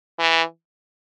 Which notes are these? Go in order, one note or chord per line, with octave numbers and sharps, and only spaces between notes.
E3